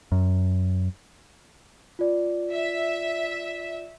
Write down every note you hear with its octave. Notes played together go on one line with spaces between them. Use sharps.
F#2
F4 D5
E5